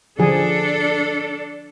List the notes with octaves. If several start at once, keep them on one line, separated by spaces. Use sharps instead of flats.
D3 F3 D4 G#4 A4